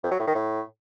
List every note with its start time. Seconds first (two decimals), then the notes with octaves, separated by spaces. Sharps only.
0.03 F2
0.11 F#3
0.19 A2
0.27 D#3
0.35 A2